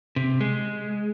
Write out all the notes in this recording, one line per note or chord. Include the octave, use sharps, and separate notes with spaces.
C3
G#3